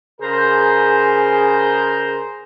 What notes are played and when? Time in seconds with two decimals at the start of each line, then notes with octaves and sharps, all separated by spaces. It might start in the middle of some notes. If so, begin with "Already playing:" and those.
0.21 C#3 G#4 A#4 C5